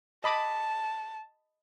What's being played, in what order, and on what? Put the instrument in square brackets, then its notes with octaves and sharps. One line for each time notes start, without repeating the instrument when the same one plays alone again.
[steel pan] D#5 B5 D6 [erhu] A5